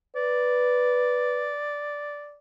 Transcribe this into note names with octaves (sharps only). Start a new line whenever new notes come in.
B4 D5